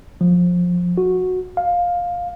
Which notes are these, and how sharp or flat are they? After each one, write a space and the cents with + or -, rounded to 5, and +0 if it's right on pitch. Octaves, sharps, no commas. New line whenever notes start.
F3 +20
F#4 -10
F5 +10